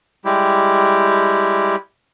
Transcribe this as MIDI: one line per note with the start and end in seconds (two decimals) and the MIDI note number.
0.25 1.76 55
0.25 1.76 56
0.25 1.76 64
0.25 1.76 67